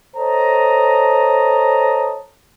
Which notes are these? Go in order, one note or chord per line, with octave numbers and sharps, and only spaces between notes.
A4 C5 C#5 D#5 A5 A#5